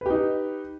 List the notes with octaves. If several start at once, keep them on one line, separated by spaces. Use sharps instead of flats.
D#4 G4 B4